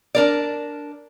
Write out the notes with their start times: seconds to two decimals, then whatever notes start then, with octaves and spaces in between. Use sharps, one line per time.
0.15 D4 A#4 D5